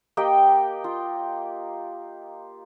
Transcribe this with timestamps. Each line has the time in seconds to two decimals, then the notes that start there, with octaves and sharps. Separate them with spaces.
0.17 A#3 G4 D#5 G5
0.84 F4